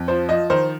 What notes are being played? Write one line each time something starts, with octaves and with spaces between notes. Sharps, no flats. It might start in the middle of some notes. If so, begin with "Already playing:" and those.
Already playing: F2
F3 C5
F3 D#5
D#3 C5